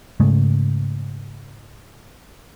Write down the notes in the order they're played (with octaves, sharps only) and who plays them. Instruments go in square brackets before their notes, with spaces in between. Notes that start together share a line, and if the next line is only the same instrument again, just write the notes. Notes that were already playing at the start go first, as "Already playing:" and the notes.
[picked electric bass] G#2 C#3 G#3 A3